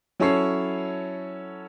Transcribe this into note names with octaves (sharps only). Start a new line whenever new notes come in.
F#3 C#4 E4 A4 C#5 C7